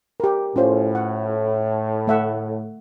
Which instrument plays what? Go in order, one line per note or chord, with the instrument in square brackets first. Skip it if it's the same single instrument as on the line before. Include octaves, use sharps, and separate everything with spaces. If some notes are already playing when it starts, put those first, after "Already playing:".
[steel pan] G4 A#4
[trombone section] A2 [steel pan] C#4 F4 C5
[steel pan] F#5
A3 E5 F#5